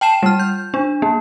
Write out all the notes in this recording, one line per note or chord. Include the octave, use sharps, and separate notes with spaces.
G5 A5 C7 E7
G3 F6
G6
D4
A#3